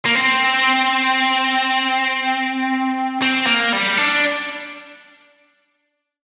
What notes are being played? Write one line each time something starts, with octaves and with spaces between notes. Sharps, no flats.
A#3
C4
C4
A#3
G3
D4